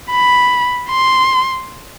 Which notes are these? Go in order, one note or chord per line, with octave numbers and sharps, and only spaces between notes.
B5
C6